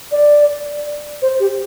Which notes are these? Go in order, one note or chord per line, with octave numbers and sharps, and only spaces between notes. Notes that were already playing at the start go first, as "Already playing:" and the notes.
D5
C5
G4